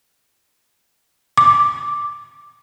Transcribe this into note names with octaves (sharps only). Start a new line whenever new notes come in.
D6